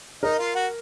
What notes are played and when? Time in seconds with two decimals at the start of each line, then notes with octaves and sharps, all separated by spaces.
0.23 D#4 A#4 D#5
0.39 F4 F5
0.55 F#4 F#5